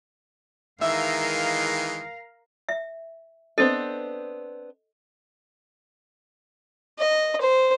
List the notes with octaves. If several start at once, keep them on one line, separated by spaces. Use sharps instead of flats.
D#3 E3 G#3 A#4 E5 F5
E5
B3 C4 D4 A4 D#5
D#5
C5